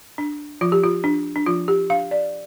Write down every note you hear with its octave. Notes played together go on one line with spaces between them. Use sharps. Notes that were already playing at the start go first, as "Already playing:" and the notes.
D4
F3 F4
G4
F4
D4
D4
F3 F4
G4
D4 F5
D5